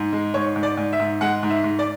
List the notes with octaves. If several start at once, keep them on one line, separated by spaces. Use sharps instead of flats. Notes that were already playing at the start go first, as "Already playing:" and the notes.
Already playing: G#2
G#3
G#2 C#5
G#2
D5
G#2
E5
G#2
G#3 F#5
G#2
E5
G#2
D5